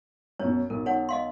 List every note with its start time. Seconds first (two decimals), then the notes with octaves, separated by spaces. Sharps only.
0.40 F#2 B2 C#5
0.70 B1 A#4
0.86 D#4 C#5 F#5
1.09 D#5 F5 C6